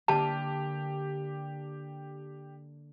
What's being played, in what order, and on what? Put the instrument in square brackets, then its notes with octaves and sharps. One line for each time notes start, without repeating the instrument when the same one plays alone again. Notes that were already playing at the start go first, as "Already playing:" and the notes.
[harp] D3 A#3 D4 [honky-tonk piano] G4 [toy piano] A5